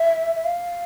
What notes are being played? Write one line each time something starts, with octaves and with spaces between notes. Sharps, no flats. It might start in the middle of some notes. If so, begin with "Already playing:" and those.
Already playing: E5
E5
F5